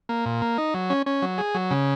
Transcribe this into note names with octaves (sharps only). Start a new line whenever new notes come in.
A#3
A#2
A#3
D#4
F#3
C#4
C#4
F#3
G#4
F#3
C#3